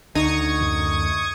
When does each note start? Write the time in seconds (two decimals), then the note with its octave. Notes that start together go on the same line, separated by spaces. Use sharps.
0.15 D2 D#4 C#6 D#6 G#6
0.61 F#2